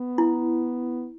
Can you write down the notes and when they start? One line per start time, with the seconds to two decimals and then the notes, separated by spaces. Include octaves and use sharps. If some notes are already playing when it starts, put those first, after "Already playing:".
Already playing: B3
0.18 E4